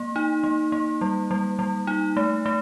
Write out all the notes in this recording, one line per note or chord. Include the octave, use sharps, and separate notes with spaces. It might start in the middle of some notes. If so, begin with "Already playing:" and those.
Already playing: A#3
D#4
A#3
A#3
G3
G3
G3
D#4
A3
A3